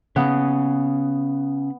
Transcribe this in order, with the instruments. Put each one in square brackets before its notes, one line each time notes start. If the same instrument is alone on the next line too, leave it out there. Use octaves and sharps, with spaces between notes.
[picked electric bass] C#3 [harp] B3